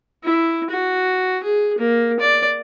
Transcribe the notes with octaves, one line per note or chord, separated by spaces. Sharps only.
E4
F#4
G#4
A#3
D5